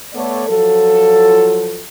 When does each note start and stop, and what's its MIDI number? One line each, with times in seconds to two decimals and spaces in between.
0.14 0.43 57
0.14 0.43 59
0.14 0.43 69
0.14 0.43 73
0.14 0.43 74
0.47 1.84 53
0.47 1.84 54
0.47 1.84 65
0.47 1.84 69